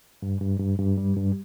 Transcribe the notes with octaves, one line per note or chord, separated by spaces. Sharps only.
G2
G2
G2
G2
G3
G2